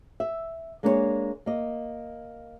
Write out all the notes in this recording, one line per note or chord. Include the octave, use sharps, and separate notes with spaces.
E5
G#3 A#3 D4 G#4 B4 C#5
A#3 D#5